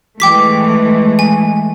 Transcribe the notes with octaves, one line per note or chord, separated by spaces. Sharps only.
E3 G#3 A3 G5 D6 B6
G#5